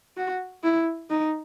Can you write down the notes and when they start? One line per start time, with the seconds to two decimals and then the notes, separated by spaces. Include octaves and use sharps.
0.17 F#4
0.64 E4
1.10 D#4